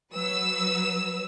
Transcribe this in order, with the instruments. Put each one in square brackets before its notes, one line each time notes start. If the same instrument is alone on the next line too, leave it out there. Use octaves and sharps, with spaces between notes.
[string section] F#3 B4 E6